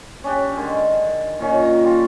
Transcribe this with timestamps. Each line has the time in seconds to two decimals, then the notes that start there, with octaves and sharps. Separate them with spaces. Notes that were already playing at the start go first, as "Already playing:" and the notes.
0.24 C#4 D4 G4
0.57 D3 D#3 G#3
1.39 A#2 D#3 C#4
1.63 A#5
1.84 G3 F4